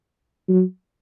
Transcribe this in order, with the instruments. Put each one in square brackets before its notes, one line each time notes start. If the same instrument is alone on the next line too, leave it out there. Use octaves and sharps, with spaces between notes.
[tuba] F#3